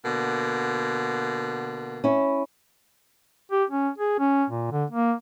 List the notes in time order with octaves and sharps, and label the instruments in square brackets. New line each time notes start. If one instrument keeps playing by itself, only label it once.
[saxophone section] B2 D3 A#3
[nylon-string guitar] C#4 E4
[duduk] G4
C#4
G#4
C#4
A#2
D3
A#3